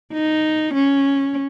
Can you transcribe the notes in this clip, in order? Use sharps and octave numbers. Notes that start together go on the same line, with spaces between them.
D#4
C#4